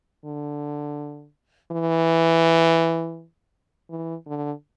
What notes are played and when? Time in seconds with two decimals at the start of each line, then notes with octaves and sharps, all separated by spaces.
0.25 D3
1.72 E3
3.90 E3
4.27 D3